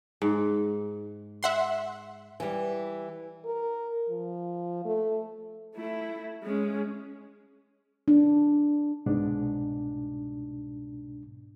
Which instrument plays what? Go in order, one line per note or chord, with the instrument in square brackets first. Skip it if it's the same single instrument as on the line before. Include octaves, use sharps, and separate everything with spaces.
[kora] G#2
[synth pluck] E5 F#5 C6
[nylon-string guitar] E3 G3
[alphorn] A#4
F3
A3
[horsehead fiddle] A3 E4
G#3 C#4
[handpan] D4
[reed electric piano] C2 G#2 B2 D4